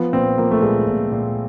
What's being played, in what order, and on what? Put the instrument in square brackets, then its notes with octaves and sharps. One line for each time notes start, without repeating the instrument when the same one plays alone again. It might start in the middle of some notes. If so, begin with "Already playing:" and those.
Already playing: [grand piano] F3 B3
A#2 C4
F3 A#3
A3
A#2 G#3
A#2
A#2